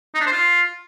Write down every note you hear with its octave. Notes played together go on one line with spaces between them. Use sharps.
D#4
D4
C5
F4